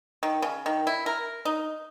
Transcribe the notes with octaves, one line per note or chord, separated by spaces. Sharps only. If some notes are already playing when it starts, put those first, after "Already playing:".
D#3
C#3
D#3
E4
A#4
D#4